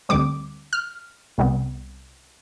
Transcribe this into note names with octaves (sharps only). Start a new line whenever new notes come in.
D2 D3 G3 C4 D6
F6
C2 C3 G3 B3